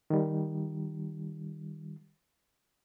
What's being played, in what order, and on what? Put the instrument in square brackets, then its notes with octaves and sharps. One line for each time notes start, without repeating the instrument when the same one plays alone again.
[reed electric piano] D#3 G3